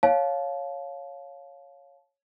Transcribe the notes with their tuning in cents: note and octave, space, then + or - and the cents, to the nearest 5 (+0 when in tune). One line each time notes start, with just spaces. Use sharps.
C#5 +0 F5 +10 A5 -25